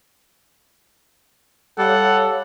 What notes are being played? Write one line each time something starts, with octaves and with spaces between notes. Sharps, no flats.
G3 A4 C#5 F5 F#5 D6